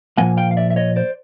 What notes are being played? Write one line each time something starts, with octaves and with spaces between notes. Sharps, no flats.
A#2 F3 A#3 F#5 G#5
F5 G5
F5
D5 E5
E5
C#5 D#5
C5 D5